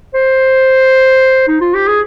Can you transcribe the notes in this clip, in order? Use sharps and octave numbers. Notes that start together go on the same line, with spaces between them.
C5
D#4
F4
G4
G#4